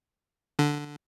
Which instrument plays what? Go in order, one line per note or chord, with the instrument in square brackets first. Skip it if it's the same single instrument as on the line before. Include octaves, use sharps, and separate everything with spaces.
[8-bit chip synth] D3